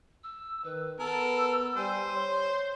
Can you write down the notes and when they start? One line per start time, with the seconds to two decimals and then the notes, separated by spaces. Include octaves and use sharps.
0.24 E6
0.64 D#3 B4
1.00 B3 A4 A#4 E6
1.77 G3 C5 G#5
2.14 C#5 C6